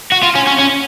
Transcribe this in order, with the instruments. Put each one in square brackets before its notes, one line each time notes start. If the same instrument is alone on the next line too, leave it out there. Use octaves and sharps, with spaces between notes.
[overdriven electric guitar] F#4
F4
C#4
C#4
C#4